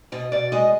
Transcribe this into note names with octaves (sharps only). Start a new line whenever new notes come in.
B2 D#5
B2 D5
G#3 D#5